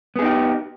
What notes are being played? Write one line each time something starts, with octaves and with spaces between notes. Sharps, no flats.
B3 D#4 G4 G#4